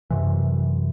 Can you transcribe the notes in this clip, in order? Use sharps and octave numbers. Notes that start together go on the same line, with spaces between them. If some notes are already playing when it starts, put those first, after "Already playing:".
F#2 C3 E3